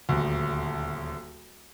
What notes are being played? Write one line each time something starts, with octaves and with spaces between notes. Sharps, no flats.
D#1 D2